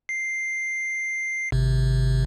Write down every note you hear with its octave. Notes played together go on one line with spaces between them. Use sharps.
C7
G#1 C3